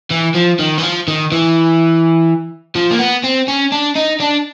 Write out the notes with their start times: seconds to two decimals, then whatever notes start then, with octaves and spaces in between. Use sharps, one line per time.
0.11 E3
0.35 F3
0.59 D#3
0.78 E3
0.83 F3
1.08 D#3
1.32 E3
2.75 F3
2.91 A#3
2.99 B3
3.24 C4
3.48 C#4
3.72 D4
3.95 D#4
4.20 D4